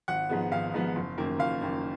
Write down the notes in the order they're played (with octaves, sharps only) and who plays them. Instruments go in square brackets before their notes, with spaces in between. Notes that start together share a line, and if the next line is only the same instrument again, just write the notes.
[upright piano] G#1 F#5
G#2 F3 G#3 B3
G#1 F5
G#2 F3 G#3 B3
F#1
F#2 D#3 A#3
F#1 F5
F#2 D#3 A#3